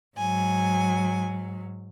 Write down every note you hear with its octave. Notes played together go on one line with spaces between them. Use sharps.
G#2 F#3 G#5